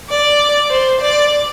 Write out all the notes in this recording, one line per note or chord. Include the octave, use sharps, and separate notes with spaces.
D5
C5
D5